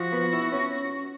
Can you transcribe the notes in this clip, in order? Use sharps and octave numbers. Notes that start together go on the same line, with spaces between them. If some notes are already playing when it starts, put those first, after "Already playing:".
Already playing: F3 F#4
B3
E4
C#4